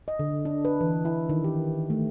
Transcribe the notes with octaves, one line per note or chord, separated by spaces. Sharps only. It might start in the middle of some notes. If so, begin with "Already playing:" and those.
D#5
D3
D4
B4
E3
E4
D#3
G4
A3